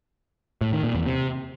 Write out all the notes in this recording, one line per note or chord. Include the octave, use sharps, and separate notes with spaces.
A2
D#3
A#2
E2
C3